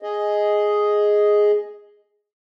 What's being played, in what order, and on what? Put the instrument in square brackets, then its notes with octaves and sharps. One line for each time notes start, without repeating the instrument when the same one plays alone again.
[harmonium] G#4 D#5